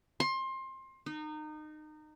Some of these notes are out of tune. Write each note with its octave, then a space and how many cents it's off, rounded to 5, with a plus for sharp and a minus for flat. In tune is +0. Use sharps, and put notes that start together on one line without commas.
C6 +25
D#4 -25